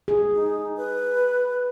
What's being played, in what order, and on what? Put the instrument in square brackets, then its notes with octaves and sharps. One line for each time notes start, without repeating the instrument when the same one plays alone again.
[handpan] G#4
[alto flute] D#4
B4